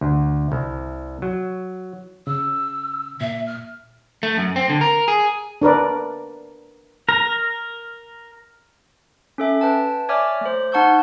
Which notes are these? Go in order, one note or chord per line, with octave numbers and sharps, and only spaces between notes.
D2
C2
F#3
C#3 E6
A#2 E5
F6
A3
F#2
C4
D3
A#4
G#4
D4 A#4 B4 D5
A#4
C#4 A4 E5
B4 G5 A5
C#5 D5 E5 G#5 D6 F6
A3 C5
D#4 F#5 A5 C#6 E6 G6